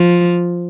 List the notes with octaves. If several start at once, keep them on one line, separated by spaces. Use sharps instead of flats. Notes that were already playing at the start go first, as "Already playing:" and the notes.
Already playing: F3